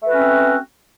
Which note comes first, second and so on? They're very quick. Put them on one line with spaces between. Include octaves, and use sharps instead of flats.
A3 B4 F#4 C#4 C4